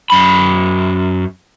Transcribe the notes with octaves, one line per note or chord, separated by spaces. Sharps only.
F#2 B5